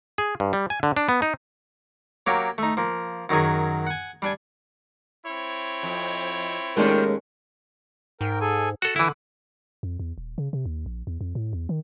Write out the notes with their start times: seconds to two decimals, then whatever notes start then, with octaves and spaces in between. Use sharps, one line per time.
0.18 G#4
0.40 G2
0.53 G3
0.70 G#5
0.83 D3
0.97 D4
1.09 B3
1.22 D#4
2.27 F#3 A#3 C#4 G4
2.58 A3 D#4
2.77 F3 A#3
3.29 F#2 D#3 F#3 G#4 D#6
3.87 F#5 G#5
4.22 G3 D4 G#5
5.26 C4 E4 C#5
5.83 F2
6.77 D#2 D#3 G#3 A3 C#4 D4 F4 A#4
8.21 G#2 A#4 G5
8.41 G#4 A4 G#5
8.82 F#4 A4 F#6
8.96 D3 E3 E4
9.83 F2
10.00 E2
10.18 D#1
10.38 C#3
10.53 C3
10.66 D#2
10.86 A#1
11.07 E2
11.21 F2
11.35 A2
11.53 E2
11.69 D#3